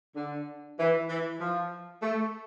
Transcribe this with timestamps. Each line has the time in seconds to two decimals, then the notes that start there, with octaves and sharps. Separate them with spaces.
0.16 D3
0.79 E3
1.09 E3
1.40 F3
2.02 A3